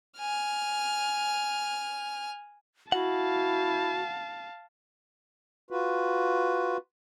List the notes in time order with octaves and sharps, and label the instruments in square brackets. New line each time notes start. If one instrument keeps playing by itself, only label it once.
[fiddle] G#5 F6
[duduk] E4 [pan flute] F#4 [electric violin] F5 A5 [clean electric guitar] F#5
[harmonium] F4 F#4 B4